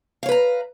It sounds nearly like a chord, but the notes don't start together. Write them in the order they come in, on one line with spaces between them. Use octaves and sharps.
F5 C#5 B4 A#5